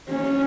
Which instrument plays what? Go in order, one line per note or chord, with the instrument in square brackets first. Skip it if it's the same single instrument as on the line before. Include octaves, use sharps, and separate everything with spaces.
[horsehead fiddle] C#4